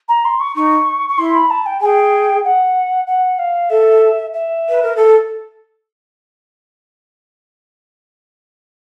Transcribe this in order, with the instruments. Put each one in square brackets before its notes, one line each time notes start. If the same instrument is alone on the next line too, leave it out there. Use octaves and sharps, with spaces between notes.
[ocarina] A#5
C6
C#6
[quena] D#4 [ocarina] C#6
[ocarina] C#6
[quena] E4 [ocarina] C6
[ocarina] B5
A5
G5
[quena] G#4 [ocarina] G5 G#5
[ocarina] F#5
F#5
F5
[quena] A4 [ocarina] E5
[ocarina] E5
[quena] B4
A#4
A4